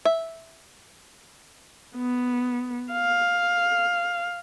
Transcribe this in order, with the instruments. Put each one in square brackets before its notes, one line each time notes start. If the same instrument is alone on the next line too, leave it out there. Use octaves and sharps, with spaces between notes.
[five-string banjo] E5
[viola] B3
F5